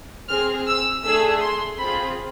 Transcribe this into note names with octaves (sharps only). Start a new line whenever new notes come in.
C4 G#4 F6
E6
A3 D4 G#4 E6
C6
C4 F4 G#4 B5